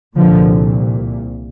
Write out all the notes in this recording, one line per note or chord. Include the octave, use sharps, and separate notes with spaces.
C2 A#2 D3 F3